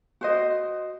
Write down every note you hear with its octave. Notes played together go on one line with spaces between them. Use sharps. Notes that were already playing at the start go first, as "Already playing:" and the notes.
F#4 C5 D#5